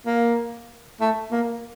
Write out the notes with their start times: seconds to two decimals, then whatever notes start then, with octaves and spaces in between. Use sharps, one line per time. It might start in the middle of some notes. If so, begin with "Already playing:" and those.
0.06 A#3
1.00 A3
1.31 A#3